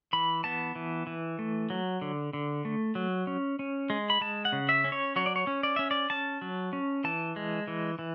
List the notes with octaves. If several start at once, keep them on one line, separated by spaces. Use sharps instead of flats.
E3 B5
B3 A5
E3
E3
A3
F#3
D3
D3
A3
F#3
C#4
C#4
G#3
B5
G#3 A5
F#5
C#3
E5
C#4
C#5
F#3 C#5
D5
C#5
C#4
D5
C#4 E5
D5
C#4 A5
F#3
C#4
E3 A5
G#3
E3
E3